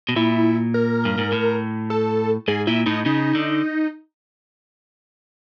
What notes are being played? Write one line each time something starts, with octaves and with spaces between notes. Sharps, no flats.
B2
A#2 E4
A#4
G2
G#2
A2
A4
G#2 G#4
A#2 E4
A2 D#4
C#3 D#4
D3